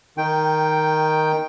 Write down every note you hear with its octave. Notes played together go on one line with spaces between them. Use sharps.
D#3 G5